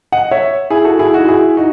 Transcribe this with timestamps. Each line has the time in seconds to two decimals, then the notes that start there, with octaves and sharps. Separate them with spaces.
0.12 D#5 F#5
0.31 C#5 E5
0.70 E4 G#4
0.85 F#4 A4
0.99 E4 G#4
1.14 D#4 F#4
1.28 E4 G#4
1.57 D#4 F#4